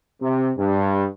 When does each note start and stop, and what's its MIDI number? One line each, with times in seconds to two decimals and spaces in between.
0.21 0.50 48
0.58 1.05 43